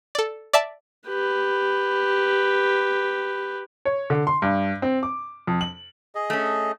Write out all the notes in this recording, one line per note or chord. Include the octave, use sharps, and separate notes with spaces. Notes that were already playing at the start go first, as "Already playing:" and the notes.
A4 D5
D5 E5 A5
G4 B4
C#5
D3
C6
G2
C4
D6
F2
F#7
G#4 D#5
A3 C#4